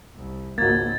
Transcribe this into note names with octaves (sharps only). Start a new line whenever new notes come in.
C2
G#1 C#2 A#3 F#4 G#6 A6